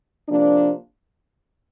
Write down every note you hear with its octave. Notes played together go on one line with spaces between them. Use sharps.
C3 F3 A#3 D4